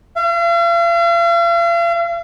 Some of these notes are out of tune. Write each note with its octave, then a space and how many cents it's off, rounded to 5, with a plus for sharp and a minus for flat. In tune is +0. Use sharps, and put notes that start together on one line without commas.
F5 -45